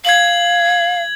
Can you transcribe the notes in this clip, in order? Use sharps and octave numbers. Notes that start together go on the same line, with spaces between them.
F5 G#6 F#7